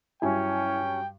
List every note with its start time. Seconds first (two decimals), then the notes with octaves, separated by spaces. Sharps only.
0.22 G2 F#3 C#4 E4 G5 G#5